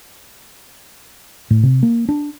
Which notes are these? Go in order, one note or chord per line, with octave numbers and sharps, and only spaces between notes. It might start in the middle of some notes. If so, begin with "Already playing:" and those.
A2
C3
A#3
D4